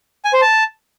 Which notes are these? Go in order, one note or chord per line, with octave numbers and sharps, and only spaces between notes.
G#5
C5
A5